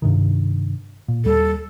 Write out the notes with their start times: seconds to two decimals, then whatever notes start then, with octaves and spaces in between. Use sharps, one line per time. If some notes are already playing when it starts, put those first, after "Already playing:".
0.02 G2 C3 D#3
1.08 A#2
1.25 D#2 G3 A4